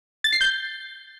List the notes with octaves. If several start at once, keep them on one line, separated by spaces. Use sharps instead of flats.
A6
C7
G6